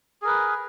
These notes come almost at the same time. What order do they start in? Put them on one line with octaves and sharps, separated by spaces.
G#4 A#4 B4